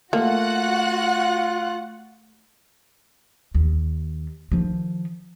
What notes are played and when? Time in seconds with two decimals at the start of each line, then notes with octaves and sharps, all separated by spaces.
0.13 A3 A#3 F4 F#4 F#5 F#6
3.55 D#2
4.52 D#3 F3